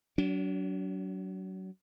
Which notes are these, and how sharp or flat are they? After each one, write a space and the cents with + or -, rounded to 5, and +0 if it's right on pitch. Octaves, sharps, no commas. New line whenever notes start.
F#3 +30 D4 -35